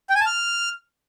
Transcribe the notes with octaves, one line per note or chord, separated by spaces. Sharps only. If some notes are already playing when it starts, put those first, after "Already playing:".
G5
G#5
A5
F6